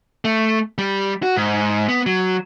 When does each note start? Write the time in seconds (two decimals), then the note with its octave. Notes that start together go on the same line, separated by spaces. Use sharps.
0.25 A3
0.78 G3
1.23 F#4
1.37 G#2
1.89 B3
2.06 F#3